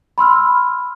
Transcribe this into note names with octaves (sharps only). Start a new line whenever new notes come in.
B5 C6 E6 F6